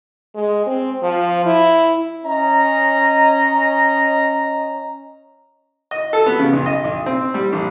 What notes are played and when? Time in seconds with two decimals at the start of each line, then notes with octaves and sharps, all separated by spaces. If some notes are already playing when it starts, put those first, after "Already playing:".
0.35 G#3
0.66 C4
1.03 F3
1.46 E4
2.25 C#4 D#5 A#5
5.91 D#5
6.13 A4
6.26 B3
6.39 C#3
6.53 B1
6.66 D#5
6.84 B1
7.06 C4
7.34 G3
7.53 A#1